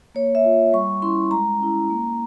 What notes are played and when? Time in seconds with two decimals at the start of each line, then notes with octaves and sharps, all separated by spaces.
0.15 A#3 C#5
0.35 E5
0.45 F4
0.73 G3 C#6
1.02 C#4 E4 C6
1.31 G#3 A#5
1.60 C#4 E4
1.90 A#3